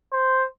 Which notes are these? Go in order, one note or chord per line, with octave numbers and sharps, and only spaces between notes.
C5